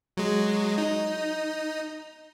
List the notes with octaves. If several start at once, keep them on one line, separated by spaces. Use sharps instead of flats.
F#3 G#3
D#4